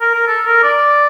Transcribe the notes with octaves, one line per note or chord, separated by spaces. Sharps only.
A#4
A#4
A4
A#4
D5